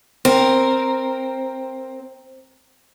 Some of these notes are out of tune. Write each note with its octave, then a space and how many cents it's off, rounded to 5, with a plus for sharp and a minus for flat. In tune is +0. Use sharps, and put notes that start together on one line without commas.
C4 +5 A#4 +0